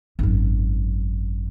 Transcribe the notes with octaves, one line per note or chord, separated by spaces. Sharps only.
G#1 F#2